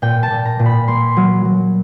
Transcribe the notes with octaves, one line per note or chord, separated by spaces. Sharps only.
A#2 G5
A5
A#2
A#5
A#2
B5
A#3 C6
F#3
F#3